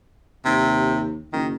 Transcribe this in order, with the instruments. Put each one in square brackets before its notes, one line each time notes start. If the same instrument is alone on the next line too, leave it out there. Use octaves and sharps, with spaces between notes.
[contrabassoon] D#2 [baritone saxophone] C3
[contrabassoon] F#1 [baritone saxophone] D#3